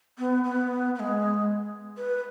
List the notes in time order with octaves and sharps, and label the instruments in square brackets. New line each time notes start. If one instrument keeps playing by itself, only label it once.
[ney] B3
B3
B3
G#3
B4